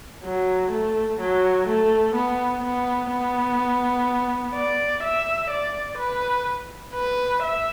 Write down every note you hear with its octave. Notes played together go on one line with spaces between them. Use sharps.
F#3
A3
F#3
A3
B3
B3
B3
D5
E5
D5
B4
B4
E5